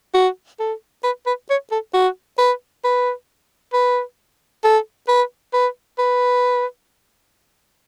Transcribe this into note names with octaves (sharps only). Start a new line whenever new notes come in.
F#4
A4
B4
B4
C#5
A4
F#4
B4
B4
B4
A4
B4
B4
B4